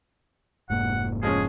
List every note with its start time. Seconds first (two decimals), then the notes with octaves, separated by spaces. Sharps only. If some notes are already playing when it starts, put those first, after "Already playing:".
0.70 F1 G#2 A#3 F#5
1.23 F3 G#3 C#4 G#4